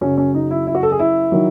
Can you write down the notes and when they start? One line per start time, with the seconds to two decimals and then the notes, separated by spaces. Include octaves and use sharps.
0.01 F#2 C#3 F#3 C#4
0.18 C#4
0.35 D#4
0.51 E4
0.67 E4
0.75 F#4
0.83 A4
0.92 G#4
0.99 E4
1.32 D#3 F#3